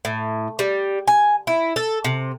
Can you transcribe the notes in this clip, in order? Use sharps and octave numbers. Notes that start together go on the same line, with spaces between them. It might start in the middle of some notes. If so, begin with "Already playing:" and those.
A2
G3
G#5
E4
A4
C3